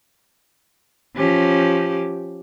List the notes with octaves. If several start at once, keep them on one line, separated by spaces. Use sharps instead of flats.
F3 C#4 G4